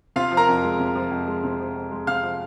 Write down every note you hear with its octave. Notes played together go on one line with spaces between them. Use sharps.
C3 F4 F5
F3
A#4 A#5
F2
G#3
C3
F3
F2
G#3
C3
F3
F2
G#3
C3 F5 F6
F3